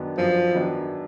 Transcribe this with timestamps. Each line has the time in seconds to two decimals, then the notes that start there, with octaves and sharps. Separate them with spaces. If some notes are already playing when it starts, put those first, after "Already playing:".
Already playing: F#2 D#3 F#3 B3 D4
0.17 F#2 F3
0.52 D#3 F#3 B3 D4